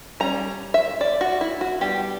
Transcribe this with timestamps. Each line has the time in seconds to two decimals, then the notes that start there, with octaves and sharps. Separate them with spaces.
0.20 G3 C#4 A#5
0.74 E5
1.01 D5
1.21 F#4
1.41 E4
1.61 F#4
1.81 G3 B3 D4 G4